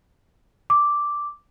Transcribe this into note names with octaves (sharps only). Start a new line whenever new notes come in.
D6